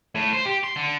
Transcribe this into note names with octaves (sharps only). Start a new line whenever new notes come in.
A2
C5
G4
C6
D3